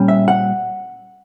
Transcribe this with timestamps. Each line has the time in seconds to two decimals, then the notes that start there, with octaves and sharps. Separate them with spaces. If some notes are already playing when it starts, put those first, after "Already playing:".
Already playing: A#2 G3 C#4
0.08 E5
0.28 F#5